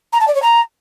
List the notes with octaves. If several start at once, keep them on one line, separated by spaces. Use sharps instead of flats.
A#5
A5
D5
C#5
A#5